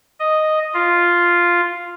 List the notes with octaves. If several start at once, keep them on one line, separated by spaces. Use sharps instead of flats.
D#5
F4